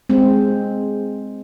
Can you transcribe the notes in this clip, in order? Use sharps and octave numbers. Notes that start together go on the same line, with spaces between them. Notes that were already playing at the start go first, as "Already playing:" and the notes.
G#3 C4